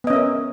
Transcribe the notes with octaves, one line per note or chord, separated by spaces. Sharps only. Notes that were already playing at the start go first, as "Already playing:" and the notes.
B3 C#4 A#4 D#5 E5